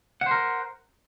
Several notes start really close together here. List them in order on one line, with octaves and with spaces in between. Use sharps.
F#5 C5 A#4